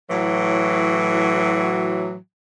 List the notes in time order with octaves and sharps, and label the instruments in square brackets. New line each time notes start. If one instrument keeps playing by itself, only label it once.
[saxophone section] A2 E3 F#3